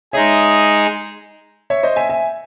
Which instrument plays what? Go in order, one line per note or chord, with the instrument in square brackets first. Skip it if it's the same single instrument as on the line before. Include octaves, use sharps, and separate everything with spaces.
[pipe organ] G#3 D#4 G#4 [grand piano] C#5 E5
[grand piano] C#5 E5
C5 D#5
E5 G#5
E5 G#5